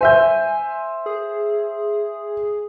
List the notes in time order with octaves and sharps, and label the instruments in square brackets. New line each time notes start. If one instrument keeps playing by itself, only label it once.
[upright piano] C5 E5 G6 [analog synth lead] G#5
[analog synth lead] G#4